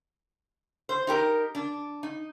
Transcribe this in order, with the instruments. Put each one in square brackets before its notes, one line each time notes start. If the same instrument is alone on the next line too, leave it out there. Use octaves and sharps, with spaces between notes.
[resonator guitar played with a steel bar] C5
D#4 G4 A#4
D4
D#4